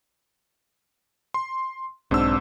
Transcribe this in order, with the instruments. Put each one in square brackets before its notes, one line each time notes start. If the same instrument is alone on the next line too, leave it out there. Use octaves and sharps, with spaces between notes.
[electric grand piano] C6
[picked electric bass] B1 C4 D4 [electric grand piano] G#2 E6